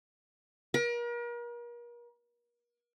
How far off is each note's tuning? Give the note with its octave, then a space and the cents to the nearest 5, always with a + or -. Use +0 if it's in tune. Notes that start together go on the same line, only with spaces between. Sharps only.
A#4 +40